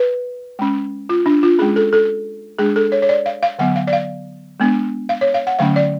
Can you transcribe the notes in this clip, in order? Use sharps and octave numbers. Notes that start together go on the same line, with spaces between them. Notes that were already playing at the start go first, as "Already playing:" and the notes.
Already playing: B4
G#3 C#4
F4
D4
F4
G#3 C#4 G#4
A4
A4
G#3 D4 G#4
A4
C#5
C#5
D5
F5
F5
D3 F#3 B3 F#5
F5
D5
F5
G#3 B3 D4
F5
C#5
F5
F#5
D3 F#3 A3 C#4 F5
D5